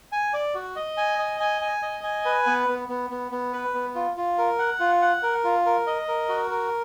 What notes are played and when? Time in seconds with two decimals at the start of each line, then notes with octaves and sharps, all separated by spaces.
0.12 G#5
0.33 D5
0.54 F#4
0.76 D#5
0.97 G#5
1.19 D#5
1.40 G#5
1.61 G#5
1.82 D#5
2.04 G#5
2.25 B4
2.46 B3
2.68 B3
2.88 B3
3.10 B3
3.32 B3
3.53 B4
3.74 B3
3.95 F4
4.17 F4
4.38 A#4
4.59 F#5
4.80 F4
5.02 F#5
5.23 A#4
5.44 F4
5.66 A#4
5.87 D#5
6.08 A#4
6.29 F#4
6.51 A#4